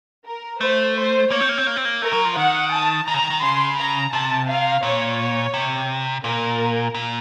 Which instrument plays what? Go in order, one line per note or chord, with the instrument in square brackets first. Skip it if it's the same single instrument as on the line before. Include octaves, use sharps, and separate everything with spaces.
[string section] A#4
[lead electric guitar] A3 [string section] C5
[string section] C5
[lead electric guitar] A#3 [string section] C#5
[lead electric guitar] C4
A#3
C4
A#3
C4
A#3
[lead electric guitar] A3 [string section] A#4
[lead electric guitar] F#3
F3
[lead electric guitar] D#3 [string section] F#5
[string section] A5
[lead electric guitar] D#3 [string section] A#5
[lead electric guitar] C#3
D#3
D#3
[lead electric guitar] C#3 [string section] C6
[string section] A#5
[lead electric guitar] C3 [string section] A5
[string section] F5
[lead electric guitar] A#2 [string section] C#5
[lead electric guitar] C3
[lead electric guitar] A#2 [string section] A#4
[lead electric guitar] A#2